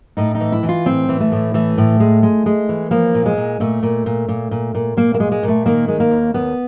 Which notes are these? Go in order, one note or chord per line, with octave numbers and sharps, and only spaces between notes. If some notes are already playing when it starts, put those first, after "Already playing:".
A2 D#4
D#4
E3
E4
E3
F4
A2 C4
E3
A3
A2
E3 A3
A2
G#3
G#3
G#3
E3
F3 A#3
A#2
G#3
A#2
A#2 A3
A#2
A#2
A#2
A#2
A#2
A#2 A#3
A#3
G#3
G#3
A#2
A3
D#3 A#3
G#3
A#3
D#2
D#2 B3